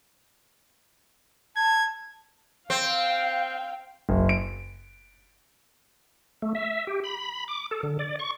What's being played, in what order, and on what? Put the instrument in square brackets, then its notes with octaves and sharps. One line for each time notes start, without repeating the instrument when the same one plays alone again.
[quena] A5 [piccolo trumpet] G#6
[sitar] C4 [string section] F5 G5
[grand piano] F#1
D7
[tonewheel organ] A3
E5
G4
B5
D6
A4
D3
D5
C#6